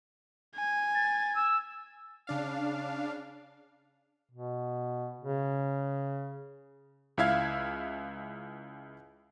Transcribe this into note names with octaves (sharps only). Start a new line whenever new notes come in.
G#5
A6
E6
C#3 D4 F5
B2
C#3
C#2 E4 E5 F5 G#6